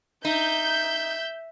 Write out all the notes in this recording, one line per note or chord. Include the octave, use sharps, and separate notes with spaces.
D#4 E5 G6